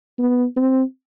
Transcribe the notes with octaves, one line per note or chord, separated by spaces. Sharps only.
B3
C4